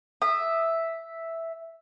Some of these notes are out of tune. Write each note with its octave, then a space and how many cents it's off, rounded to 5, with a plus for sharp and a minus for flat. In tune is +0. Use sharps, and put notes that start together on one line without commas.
E5 +0 D#6 -25